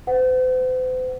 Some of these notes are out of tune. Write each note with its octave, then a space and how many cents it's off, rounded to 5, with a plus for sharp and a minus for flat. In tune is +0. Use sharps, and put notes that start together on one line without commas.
C5 -45 F#5 +15